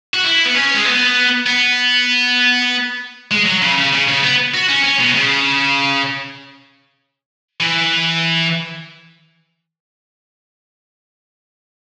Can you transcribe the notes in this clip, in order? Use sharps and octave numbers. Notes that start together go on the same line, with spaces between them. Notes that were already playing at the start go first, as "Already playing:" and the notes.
F#4
E4
B3
C#4
G#3
B3
B3
G#3
F#3
C#3
C#3
C#3
C#3
B3
F#4
C#4
C#4
B2
C#3
E3